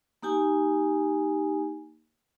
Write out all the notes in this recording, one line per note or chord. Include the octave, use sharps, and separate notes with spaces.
A#3 D#4 G4 G#5